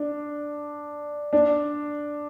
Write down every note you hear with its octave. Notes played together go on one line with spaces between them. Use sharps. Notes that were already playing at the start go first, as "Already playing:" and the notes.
Already playing: D4
D4